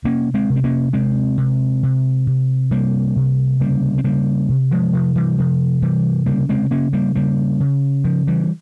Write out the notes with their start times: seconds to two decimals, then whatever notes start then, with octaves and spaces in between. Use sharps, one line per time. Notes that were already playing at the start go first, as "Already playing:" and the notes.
0.04 C3 A#3 C#4
0.34 G#3 C4
0.50 C3
0.56 C4
0.64 A#3 C#4
0.93 C3 G#3 C4
1.38 C3
1.83 C3
2.27 C3
2.71 C3 G3 A#3
3.16 C3
3.60 C#3 G3 A#3
3.98 C4
4.04 C#3 G3 A#3
4.49 C3
4.71 F3 G#3
4.93 C3 F3
5.16 E3 G3
5.38 C3 F3
5.82 C3 E3 G3
6.26 C#3 G3 A#3
6.49 G#3 C4
6.71 C#3 A#3 C#4
6.93 G3 A#3
7.15 C#3 G3 A#3
7.60 C#3
8.04 C#3 F3
8.27 E3 G3